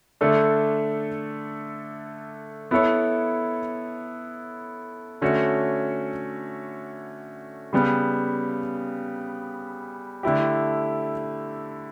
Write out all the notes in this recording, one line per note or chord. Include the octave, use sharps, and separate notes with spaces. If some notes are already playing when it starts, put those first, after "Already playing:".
D3 A3 D4 A4
B3 E4 A4 C#5
D3 A3 C#4 F#4 C#5
C#3 G3 B3
D3 A3 E4 G4